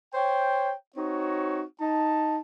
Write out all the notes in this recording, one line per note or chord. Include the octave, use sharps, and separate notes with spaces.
C5 C#5 G5
C4 D#4 F#4 C#5
D#4 A5